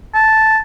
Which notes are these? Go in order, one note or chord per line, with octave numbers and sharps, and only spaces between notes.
A5